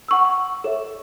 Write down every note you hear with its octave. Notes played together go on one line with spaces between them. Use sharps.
F#5 C#6 E6
A4 C#5 E5